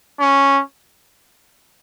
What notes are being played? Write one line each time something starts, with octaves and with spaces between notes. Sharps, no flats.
C#4